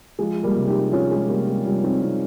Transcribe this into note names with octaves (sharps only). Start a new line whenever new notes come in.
F3 G#3
G3 A#3
C3
D#4 G4
F3 C#4 F4
G#3
C3 G3 A#3
G#3
F3 G3
C4 D#4
C3 C4 D#4